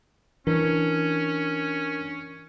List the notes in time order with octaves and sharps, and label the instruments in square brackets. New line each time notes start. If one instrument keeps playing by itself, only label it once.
[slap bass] E3 [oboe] C#4 [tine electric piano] D4 A#4